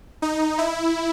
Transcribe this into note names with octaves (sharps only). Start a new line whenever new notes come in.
D#4
E4